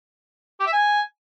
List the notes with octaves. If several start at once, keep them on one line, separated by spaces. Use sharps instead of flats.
G4
E5
G#5